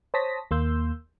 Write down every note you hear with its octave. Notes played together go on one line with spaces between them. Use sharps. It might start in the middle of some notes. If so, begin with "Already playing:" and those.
C5 C#5 A5 D#6 A#6 B6
D#2 A#3 C6 E6 G6